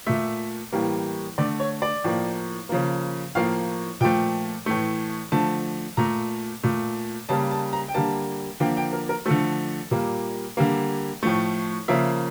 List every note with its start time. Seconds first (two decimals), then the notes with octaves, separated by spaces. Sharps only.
0.07 A#2 A3 E5
0.72 A2 E3 G3 A#3
1.38 D3 A3 D5
1.60 C#5
1.82 D5
2.04 A2 F3 A#3
2.69 C#3 F3 A#3
3.35 A2 F3 A#3 F5
4.01 A#2 F3 A3 G5
4.66 A2 E3 A3
5.32 D3 F3 A3 A5
5.97 A#2 A3 A#5
6.63 A#2 A3
7.29 C#3 G3 A#3 A5
7.51 A5
7.73 A#5
7.88 G5
7.94 D3 G3 A#3 A5
8.60 D3 F3 A#3 G5
8.77 G5
8.93 A#4
9.09 A#4
9.26 D3 F3 A3 A4
9.91 A#2 G3 A#3
10.57 D3 G3 A#3
11.23 A2 F3 A3
11.88 C#3 F3 A#3 E5